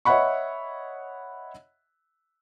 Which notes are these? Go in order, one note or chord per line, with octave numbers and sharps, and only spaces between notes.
C#5 D#5 E5 F#5 B5 C#6